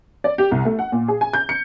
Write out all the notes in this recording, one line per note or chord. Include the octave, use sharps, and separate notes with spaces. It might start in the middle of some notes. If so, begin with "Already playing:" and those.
D5
G4
C2
A3
F#5
A#2
G#4
G#5
G6
C#7